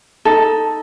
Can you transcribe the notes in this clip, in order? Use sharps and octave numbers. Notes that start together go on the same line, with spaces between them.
D#4 A4